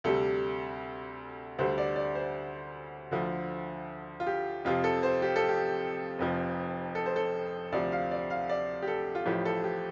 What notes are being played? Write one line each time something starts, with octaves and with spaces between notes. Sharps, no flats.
D2 C3 G3 A4
D2 D3 G3 C5
D5
D5
C5
D2 D3 F3
F4
G4
F2 C3 F3 F4
A4
C5
G4
A4
G4
F1 F2 F3
A4
C5
A4
D2 C3 F3 D5
F5
D5
F5
D5
G4
A4
F4
A1 A2 F3 G4
A4
G4